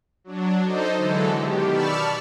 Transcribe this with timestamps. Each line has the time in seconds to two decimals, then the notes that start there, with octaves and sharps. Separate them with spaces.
0.24 F#3 D4
0.64 D#4 A4 C5 D#5
0.98 D3 E3 F#3 G#3 A4
1.38 B2 D#3 G4
1.69 D5 A5 B5 C#6 E6 F6